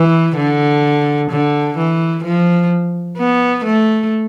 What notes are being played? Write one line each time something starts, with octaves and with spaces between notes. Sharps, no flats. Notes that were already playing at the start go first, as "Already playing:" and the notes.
Already playing: E3
D3
D3
E3
F3
B3
A3